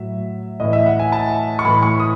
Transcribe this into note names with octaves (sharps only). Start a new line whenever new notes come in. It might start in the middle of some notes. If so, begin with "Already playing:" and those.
Already playing: A2 F#3 E5
A2 E3 D#5
E5
F#5
G#5
A5
C#6
A2 E3 B5
C#6
D#6